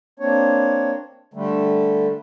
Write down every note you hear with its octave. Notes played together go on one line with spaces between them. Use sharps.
A#3 C4 D4 C#5
D3 G3 A3